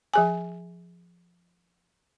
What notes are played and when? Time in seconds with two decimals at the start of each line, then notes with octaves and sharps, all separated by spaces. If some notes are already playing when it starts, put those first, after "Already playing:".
0.14 F3 G#4 G#5